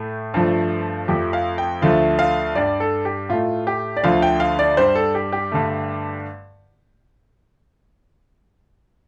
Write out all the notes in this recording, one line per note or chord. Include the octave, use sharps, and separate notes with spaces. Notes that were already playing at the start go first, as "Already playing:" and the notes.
Already playing: A2 A3
G2 F3 A3
F2 F3 A3 G4
F5
G5
D2 D3 F3 A3 F5
F5
G2 G3 D5
A4
G4
A2 A3 F4
G4
D5
D2 D3 F3 A3 F5
G5
F5
D5
G2 G3 C5
A4
G4
G4
G2 D3 A3